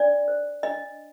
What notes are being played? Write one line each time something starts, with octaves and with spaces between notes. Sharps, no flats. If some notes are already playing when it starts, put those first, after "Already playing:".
Already playing: D4 D5
C5
D4 D#5